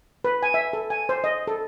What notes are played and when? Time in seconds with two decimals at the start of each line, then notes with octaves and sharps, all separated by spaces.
0.24 B4
0.43 G#5
0.54 E5
0.73 A4
0.90 G#5
1.09 C5
1.24 D#5
1.47 A4